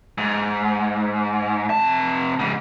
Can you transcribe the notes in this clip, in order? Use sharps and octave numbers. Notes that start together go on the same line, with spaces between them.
G#2
C3 A5
G#2 C#3